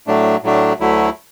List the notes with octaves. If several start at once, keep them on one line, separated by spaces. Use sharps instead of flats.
A2 F#3 A3 D4
A2 F#3 A3 D4
D2 D3 F#3 A3 E4